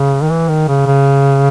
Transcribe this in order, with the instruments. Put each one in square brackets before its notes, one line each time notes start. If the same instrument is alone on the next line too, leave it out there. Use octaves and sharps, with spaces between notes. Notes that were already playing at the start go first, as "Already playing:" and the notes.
Already playing: [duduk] C#3
D#3
E3
D#3
C#3
C#3